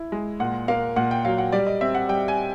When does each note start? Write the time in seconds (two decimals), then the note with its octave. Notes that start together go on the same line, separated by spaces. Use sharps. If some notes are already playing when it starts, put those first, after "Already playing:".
Already playing: E4
0.12 G#3
0.40 A#2 F#5
0.68 A#3 F5
0.96 A#2 F#5
1.11 G5
1.25 F#3 F5
1.38 F#5
1.52 G3 D5
1.67 D#5
1.81 C4 E5
1.95 F#5
2.09 G3 G5
2.28 G#5